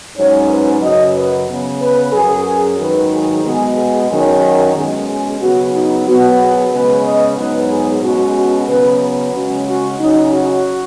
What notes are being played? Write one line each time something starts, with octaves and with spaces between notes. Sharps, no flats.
G#2 F#3 C#4 C#5
B4
F#2 C#3 F#3 D#5
B4
C#3 B3
B4
F#2 F#3 C#4 G#4
G#2 D#3 F#3 B4
G#4
B2 G#3 B3 G#4
G#4
F#2 D#3 F#3 C#4
F#4
B2 G#3 C#4 G#4
G#4
C#3 F#3 B3 F#4
D#4
B2 F#3 B3 F#4
G#4
C#3 G#3 B3 B4
D#5
G#2 F#3 B3 B4
G#4
B2 G#3 C#4 F#4
F#4
C#3 F#3 B3 B4
C#3 G#3 C#4 F#4
F#4
C#3 F#3 C#4 D#4
F#4